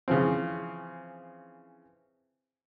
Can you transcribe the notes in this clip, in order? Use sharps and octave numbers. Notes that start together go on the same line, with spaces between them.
C#3 E3 F3 C4